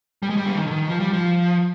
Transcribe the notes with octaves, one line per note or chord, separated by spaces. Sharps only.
G3
G#3
G3
D3
D#3
D3
D#3
F3
G3
F3